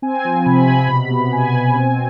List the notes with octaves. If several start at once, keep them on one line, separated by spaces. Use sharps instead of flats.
C4 G#5
F3
C3 B5
G#5
C3 B5
B2
B3
B3 G#5
B2
C4